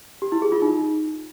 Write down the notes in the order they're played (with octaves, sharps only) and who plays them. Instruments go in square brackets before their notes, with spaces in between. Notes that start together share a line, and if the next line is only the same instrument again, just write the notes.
[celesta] G4
E4
G#4
F4
D#4